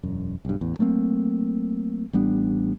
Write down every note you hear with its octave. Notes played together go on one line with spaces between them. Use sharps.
E1 F#2
B1 G2
A1 E2
F#3 A3 A#3 C4
A1 G3 B3 D4